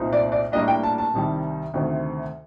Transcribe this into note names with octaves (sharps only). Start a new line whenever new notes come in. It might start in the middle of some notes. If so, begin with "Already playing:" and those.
Already playing: C2 A#2 A3 C4 D#4
D5
D5
A2 G3 A#3 D4 D#5
G5
A5
A5
C2 C3 D#3 G3
D2 C3 D#3 A3 C4